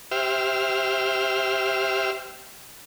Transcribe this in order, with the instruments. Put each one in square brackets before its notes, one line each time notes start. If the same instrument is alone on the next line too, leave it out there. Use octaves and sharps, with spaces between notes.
[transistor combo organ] G4 C5 E5 F6